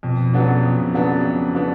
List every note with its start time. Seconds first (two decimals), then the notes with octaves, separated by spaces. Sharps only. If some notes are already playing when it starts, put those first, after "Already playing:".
0.03 F2 B2
0.33 C#3 F#3 B3 D4
0.63 F2
0.94 C#3 F#3 B3 D4
1.24 F2
1.54 C#3 F#3 B3 D4